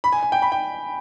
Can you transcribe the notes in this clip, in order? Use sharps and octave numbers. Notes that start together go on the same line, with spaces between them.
B5
G#5
G#5
G5
B5
G5